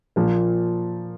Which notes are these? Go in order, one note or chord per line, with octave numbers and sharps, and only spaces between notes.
A#2 F3 A#3